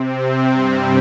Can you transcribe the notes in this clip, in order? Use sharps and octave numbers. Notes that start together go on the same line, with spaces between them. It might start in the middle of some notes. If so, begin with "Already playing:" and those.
Already playing: C3 C4
G2 G3